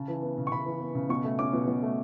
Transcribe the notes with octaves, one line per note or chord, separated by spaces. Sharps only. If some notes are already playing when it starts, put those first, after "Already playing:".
Already playing: C#3 A5
E3
B3
C#3
C#6
C#3 B5
E3
B3
C#3
B2 C#6
A3
C#4 D6
B2
B2
A3